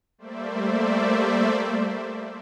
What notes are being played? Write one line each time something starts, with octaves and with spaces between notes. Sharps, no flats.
G3 A3 A#3 C5 D5 E5